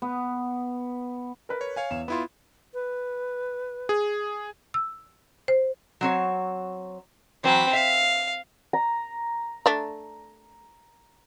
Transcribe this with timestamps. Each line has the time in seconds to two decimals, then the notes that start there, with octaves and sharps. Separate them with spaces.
0.02 B3
1.49 A#4 B4
1.61 C#5
1.76 C#5 F5 G#5
1.90 E2 E7
2.08 B3 E4 F4 B5 C6
2.74 B4
3.89 G#4
4.74 E6
5.48 C5
6.01 F#3 C4 C#5
7.44 E3 F#3 C4 B5
7.73 E5 F5
8.73 A#5
9.66 A3 D4